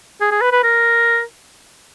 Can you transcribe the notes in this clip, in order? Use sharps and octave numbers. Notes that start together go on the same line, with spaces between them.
G#4
G#4
B4
B4
A#4